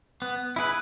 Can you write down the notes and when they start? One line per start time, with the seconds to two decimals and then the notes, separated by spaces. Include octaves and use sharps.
0.22 B3
0.56 E4 G#4 B4